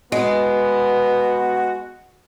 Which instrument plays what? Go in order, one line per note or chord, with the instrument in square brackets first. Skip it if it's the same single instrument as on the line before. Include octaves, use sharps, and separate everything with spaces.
[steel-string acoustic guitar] G#3 [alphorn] B3 [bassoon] F#4